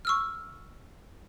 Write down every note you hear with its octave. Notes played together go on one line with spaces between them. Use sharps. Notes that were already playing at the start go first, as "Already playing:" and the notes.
C#6 E6 F6